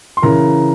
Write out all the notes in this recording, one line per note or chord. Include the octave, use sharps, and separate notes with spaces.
C6
C#3 E3 A#4 A#5